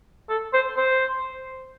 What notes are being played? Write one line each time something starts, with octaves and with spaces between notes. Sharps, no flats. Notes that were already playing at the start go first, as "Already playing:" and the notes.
A4
C5
C5